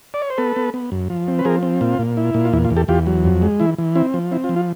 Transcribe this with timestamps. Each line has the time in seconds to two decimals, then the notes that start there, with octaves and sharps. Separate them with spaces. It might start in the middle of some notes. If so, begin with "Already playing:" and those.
0.14 D5
0.22 C#5
0.30 C5
0.38 B3 A4 B4
0.56 B3
0.74 B3
0.92 F#2
1.10 F3
1.28 C4
1.39 B4
1.45 F3 G#4 A#4
1.63 C4
1.81 A#2 F4
1.99 A#2
2.17 E4
2.34 A#2
2.45 F4
2.53 E2 E4
2.65 F4
2.70 E2
2.76 G4 A4
2.88 E2 F4 G4
3.06 F#3
3.24 F2
3.42 G#3
3.60 E3 E4
3.78 E3
3.95 C4 E4
4.14 F3
4.31 C4 E4
4.44 F4
4.49 F3
4.56 F4